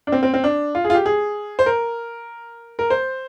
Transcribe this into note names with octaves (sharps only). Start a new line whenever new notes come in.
D4
C4
C4
C4
D4
F4
G#4
F4
G4
G#4
C5
A#4
A#4
C5